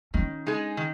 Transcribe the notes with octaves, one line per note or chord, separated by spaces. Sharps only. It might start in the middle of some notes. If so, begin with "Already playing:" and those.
D#3 C#4
G#3 D#4 G#4
D#3